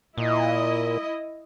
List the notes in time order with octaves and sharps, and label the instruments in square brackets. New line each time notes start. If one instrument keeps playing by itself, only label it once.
[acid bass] A#2 [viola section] E4 D#5